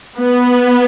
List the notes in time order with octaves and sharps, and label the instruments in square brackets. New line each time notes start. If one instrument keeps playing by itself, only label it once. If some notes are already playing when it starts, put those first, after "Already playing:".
[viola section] B3